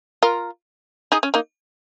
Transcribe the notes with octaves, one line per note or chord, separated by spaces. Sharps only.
F4 A#4
D#4 G#4
C#4
A#3 D#4